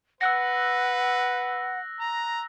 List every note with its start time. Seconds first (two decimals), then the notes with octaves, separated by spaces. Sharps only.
0.21 B4 F#5 E6 F#6 A#6
2.01 A#5